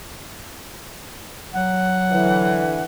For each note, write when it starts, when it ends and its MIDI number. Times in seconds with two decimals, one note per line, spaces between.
1.53 2.69 54
1.53 2.84 78
2.11 2.83 50
2.11 2.83 52